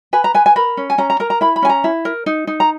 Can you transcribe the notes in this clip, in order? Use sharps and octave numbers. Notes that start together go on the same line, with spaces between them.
B4 G#5
A#5
B4 G#5
G#5
A#4 B5
C#4
G#5
C#4 A#5
A#5
A#4 A#5
A#5
E4 B5
B5
C#4 G#5
A#5
E4
A#4
D#4
D#4
A#5